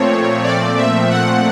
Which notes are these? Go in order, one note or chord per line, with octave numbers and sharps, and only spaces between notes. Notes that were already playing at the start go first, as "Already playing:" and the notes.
Already playing: A#2 F3 A3 C4 C#5
D5
E5
F#5